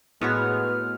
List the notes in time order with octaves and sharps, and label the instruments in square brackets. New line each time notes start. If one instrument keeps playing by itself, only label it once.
[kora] A2 F#4 C#5 [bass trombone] G#3 [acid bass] B3 [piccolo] F6